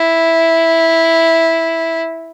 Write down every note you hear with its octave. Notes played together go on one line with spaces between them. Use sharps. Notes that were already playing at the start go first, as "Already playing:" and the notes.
Already playing: E4